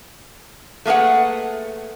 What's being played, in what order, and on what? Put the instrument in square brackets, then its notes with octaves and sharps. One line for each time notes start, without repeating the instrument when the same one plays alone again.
[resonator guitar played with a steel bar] A3 A#3 G#4 B4 F#5